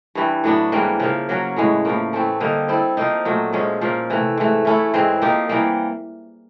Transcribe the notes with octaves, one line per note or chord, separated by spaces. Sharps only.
G2 E3 G3
A2 F#3 B3 D4
G#2 E3 G3 A#3
C#3 F3 A#3
F#3 A#3 C#4 F#4
A2 E3 G#3
A2 F3 A#3
E3 A3 C4
D3 G3 A#3 D#4
G3 C4 E4 A4
F3 A#3 D#4
A#2 F#3 A3
A#2 F3 G#3 C#4
A#2 F3 A#3
C3 E3 A3
G#2 E3 A3
E3 A3 C#4 E4
G#2 E3 G#3 C4
F3 A#3 D#4 G4
E3 G3 A#3